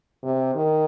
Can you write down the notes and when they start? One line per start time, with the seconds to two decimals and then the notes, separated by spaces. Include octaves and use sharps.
0.23 C3
0.55 D#3